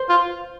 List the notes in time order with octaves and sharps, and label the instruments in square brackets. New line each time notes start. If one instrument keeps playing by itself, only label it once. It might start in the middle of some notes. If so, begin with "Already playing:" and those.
Already playing: [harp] C5
[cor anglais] F4